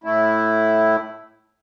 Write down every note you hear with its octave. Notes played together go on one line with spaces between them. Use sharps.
A2 A3 E4